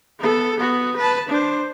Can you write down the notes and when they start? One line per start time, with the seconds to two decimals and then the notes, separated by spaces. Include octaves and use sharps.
0.19 B3 A4
0.58 B3 F#4
0.97 B4 A5
1.29 D4 C5